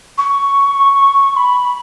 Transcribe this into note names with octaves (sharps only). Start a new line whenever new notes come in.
C#6
B5